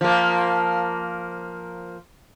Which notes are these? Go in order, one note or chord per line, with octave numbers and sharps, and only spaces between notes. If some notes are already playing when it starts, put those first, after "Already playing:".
F3 A#3